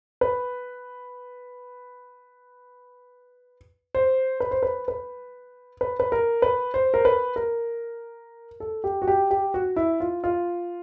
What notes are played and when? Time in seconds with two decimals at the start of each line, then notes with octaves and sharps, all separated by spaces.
0.21 B4
3.95 C5
4.40 B4
4.51 C5
4.63 B4
4.88 B4
5.81 B4
6.00 B4
6.12 A#4
6.42 B4
6.74 C5
6.94 A#4
7.05 B4
7.36 A#4
8.60 A4
8.84 G4
9.02 F#4
9.08 G4
9.31 G4
9.54 F#4
9.76 E4
10.00 F4
10.24 F4